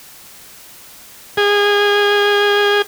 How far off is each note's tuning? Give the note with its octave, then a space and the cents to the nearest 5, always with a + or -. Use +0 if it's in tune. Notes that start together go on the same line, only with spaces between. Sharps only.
G#4 -25